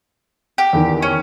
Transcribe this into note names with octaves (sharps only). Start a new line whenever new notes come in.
G4
E2 D#3
C#4